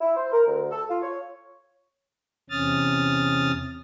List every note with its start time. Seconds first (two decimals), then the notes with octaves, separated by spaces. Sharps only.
0.01 E4
0.16 C5
0.32 A#4
0.46 D2
0.71 A4
0.89 F4
1.02 C#5
2.50 E2 C3 C#4 D#6 F6 A6